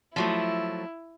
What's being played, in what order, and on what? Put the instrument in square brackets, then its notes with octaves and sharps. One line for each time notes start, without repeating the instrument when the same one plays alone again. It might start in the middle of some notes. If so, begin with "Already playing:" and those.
[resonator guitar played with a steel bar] F3 F#3 A3 [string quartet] E4